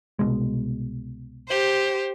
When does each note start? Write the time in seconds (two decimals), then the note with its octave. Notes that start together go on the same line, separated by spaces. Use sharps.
0.19 C2 B2 G#3
1.48 G4 C5